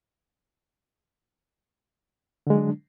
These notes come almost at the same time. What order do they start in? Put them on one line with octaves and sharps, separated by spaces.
D3 G#3 F#3 D4